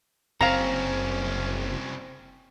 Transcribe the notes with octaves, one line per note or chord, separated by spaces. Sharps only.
F#1 C2 C4 C#4 F5 A#5